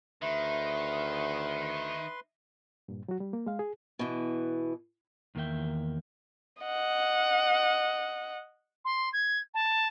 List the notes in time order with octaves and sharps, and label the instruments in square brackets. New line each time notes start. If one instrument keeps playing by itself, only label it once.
[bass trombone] D2 [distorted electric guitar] D#3 [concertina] B4 C6 [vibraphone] E5
[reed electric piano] G2 A#2
F#3 F#4
G3
A#3
G#3 F5
G#4
[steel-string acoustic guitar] B2 E3
[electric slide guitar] E2 D#3 A#3 A#4 E5 G5
[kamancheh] D#5 F#5
[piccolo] C6
G#6
A5